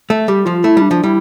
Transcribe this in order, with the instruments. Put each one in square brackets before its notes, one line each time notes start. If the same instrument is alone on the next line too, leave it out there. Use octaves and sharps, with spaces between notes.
[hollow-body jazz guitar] A3
[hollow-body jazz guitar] G3 [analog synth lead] G4
[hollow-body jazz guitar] F3 [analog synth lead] F4
[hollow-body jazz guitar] A3 [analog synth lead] E4
[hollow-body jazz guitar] G3 [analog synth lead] D4
[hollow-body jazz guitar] F3
[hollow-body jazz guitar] G3 [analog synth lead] E4